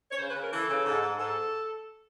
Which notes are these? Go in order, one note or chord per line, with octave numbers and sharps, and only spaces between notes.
C#5
C#3 C5
B4
C#3 A#4
E3 A4
C#3
G#2
G#2
G#2 A4